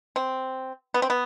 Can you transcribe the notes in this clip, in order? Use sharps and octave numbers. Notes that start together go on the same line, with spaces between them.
C4
B3
C4
B3